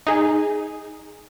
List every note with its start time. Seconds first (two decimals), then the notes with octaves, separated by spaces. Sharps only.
0.07 D#4 G#4